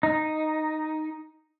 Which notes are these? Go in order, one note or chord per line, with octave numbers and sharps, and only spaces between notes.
D#4